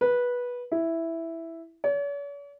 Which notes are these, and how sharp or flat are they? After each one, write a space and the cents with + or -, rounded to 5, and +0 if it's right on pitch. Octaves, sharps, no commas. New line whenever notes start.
B4 -15
E4 +0
C#5 +45